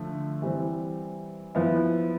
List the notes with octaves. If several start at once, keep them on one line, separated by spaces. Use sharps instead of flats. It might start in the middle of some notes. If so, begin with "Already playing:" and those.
Already playing: D3 F3 A3
E3 G3 C4
F3 B3 E4